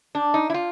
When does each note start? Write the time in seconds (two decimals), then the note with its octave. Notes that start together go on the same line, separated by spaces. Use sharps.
0.15 D4
0.34 D#4
0.50 E4
0.54 F4